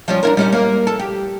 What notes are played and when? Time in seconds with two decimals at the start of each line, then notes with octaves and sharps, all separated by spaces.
0.08 F3 G3 C#4
0.23 D4 E4 A#4
0.37 G3 C#4 D#4
0.52 A#3
0.87 A4
0.99 G4